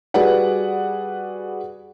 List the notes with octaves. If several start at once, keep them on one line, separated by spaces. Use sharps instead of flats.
G3 F#4 G#4 B4 D5 F#5